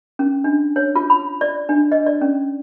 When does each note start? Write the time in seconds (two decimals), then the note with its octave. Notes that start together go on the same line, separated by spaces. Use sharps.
0.19 C#4
0.44 D4
0.76 C#5
0.96 F4
1.10 B5
1.41 D5
1.69 D4
1.92 D#5
2.06 D5
2.21 C#4